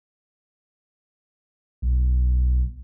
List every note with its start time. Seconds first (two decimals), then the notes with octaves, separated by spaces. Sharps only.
1.82 B1